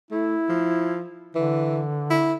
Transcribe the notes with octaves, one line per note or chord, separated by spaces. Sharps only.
A3 E4
F3
D3 E3
E4